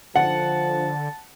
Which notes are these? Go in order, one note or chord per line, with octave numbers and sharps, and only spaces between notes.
D3 F3 F#5 A5